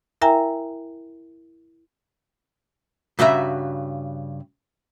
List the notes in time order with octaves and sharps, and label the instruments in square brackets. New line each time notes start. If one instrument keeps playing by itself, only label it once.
[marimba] E4 A#4 E5 G5 G#5 A#5
[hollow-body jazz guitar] G2 C#3 F#4 E5 A#5